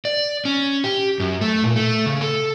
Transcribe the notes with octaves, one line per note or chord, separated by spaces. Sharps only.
D5
C#4
G4
F#2
A3
A#2
A3
C#3
A4